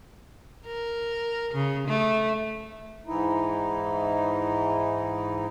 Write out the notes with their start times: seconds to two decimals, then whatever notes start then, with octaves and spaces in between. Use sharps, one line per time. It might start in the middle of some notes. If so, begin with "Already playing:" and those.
0.66 A#4
1.54 C#3
1.87 A3
3.07 G#2 E3 D#4 E4